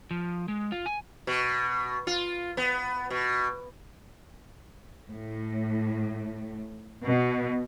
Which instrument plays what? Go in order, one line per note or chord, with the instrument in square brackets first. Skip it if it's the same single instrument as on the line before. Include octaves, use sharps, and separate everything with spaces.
[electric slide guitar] F3
G#3
F4
G#5
[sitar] B2
F4
B3
B2
[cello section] A2
B2